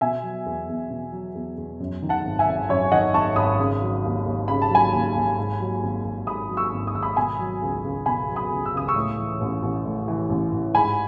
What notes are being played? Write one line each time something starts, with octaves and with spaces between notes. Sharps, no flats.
B2 E5 G#5
F#3
E2
E2
B2
F#3
E2
E2
F#2
D#3
F#5 A5
G#1
E5 G#5
G#1
F#2 C#5 E5
D#3 D#5 F#5
G#1 A5 C#6
G#1 B5 D#6
C#3
F#3
D#2
D#2
C#3 B5
A5
F#3 G#5 B5
D#2
D#2
G#2
F#3
G#1
G#1
G#2 B5 D#6
F#3
C#6 E6
G#1
D#6
G#1 E6
B5 D#6
B2 G#5 B5
F#3
C#2
C#2
B2 G#5 B5
F#3
B5 D#6
C#2
E6
C#2 D#6
C#6 E6
A2
E3
A1
A1
A2
E3
A1
A1
G#2 G#5 B5